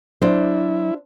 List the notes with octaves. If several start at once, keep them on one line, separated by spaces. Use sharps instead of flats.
F#3 D4 E4 C5